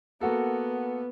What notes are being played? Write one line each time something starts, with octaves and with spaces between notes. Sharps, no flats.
A#3 B3 F#4 A4